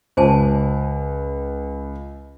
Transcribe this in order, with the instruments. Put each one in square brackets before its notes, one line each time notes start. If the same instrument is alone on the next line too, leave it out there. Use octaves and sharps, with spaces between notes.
[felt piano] C#2 [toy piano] C5 G#5 A5